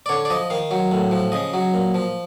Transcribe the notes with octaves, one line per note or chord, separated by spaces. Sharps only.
D5
D3 C#5
D5
F3 D#5
D#3 F5
F#3
A2
F3
C#3 D#5
F#3
A#2
F3